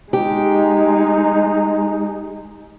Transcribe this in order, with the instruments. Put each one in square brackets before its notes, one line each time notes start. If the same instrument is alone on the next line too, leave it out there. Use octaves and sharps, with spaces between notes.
[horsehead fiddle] G#3 D#4 [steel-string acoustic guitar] G4